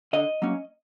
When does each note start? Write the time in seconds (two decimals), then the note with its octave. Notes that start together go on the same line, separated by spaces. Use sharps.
0.13 D3 D#5
0.42 F#3 A#3 C#4